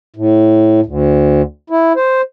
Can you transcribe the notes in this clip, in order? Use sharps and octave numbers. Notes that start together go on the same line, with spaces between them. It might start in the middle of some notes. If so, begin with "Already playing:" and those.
A2
D2
E4
C5